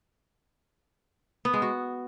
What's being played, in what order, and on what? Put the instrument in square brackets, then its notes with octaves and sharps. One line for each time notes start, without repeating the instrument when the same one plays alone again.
[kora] B3
G#3
F#4